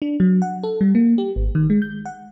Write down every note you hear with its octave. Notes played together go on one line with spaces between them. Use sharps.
D4
F#3
F#5
A4
G3
A#3
G4
G#1
D#3
G#3
G6
F#5